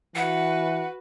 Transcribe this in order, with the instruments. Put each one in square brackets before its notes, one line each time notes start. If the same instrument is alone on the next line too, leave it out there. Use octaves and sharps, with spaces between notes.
[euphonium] E3 [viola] F#4 B4 [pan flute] F#5